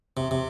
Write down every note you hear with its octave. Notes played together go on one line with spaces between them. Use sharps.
C3
C3